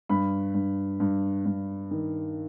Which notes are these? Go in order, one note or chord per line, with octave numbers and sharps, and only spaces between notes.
G2 B5
G2
G2
G2
D#3